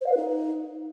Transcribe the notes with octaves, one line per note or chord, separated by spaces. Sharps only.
C5
F5
B4
D#4